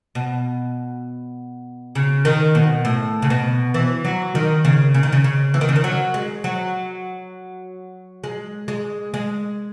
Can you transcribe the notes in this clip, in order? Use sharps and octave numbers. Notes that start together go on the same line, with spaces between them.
B2
C#3
D#3
B2
A2
C#3
B2
E3
F#3
D#3
C#3
C#3
D#3
C#3
C#3
E3
D#3
C#3
D#3
F#3
G#3
F#3
G#3
G#3
G#3